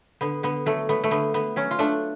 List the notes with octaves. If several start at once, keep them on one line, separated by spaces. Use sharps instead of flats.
D3 B3
D3 B3
F#3 A3
A3 B3
A3
D3 B3
D3 B3
F#3 C#4
F4
A3 D4